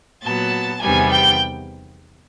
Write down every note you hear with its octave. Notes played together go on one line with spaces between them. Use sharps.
A#2 F#3 B3 A5
E2 C3 D#3 G3 B3 G#5
G5